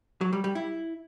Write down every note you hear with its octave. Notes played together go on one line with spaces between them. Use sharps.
F#3
G3
G3
E4